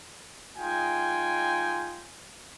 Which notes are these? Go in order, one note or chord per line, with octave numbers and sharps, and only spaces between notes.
G#3 D#4 F4 G5 G#5